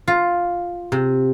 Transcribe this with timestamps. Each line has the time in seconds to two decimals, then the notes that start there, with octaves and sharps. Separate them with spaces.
0.08 F4
0.92 C3